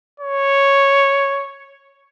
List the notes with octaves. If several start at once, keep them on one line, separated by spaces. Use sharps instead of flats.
C#5